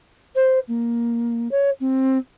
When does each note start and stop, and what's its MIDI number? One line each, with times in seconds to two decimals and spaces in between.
0.35 0.59 72
0.67 1.48 58
1.51 1.70 73
1.80 2.17 60